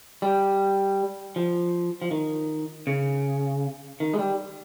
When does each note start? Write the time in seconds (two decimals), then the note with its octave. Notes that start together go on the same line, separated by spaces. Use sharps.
0.22 G3
1.36 F3
2.02 F3
2.11 D#3
2.87 C#3
4.00 D#3
4.14 G#3
4.19 G3